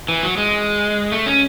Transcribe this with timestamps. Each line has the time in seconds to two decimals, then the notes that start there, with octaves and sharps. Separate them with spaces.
0.09 E3
0.23 F#3
0.38 G#3
1.12 A3
1.26 C#4